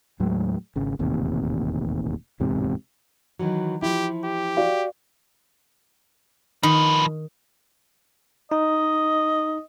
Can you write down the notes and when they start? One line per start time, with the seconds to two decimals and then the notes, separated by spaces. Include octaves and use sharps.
0.20 D#2 A2 F#3 G#3
0.76 G#1 C#3
0.99 E1 A1 D#2 C3
2.40 D1 E2 G#2 C3
3.39 D#3 E3 F#3
3.82 F3 E4 G4
4.24 G4
4.57 F#4 D5 F5
6.63 D#3 F3 B4
8.52 D#4 D#5